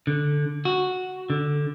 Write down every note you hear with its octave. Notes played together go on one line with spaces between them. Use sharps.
D3
F#4
D3